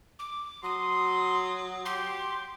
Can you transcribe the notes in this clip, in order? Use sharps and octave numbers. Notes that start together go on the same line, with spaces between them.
D6
F#3 C6 D#6
G4 C6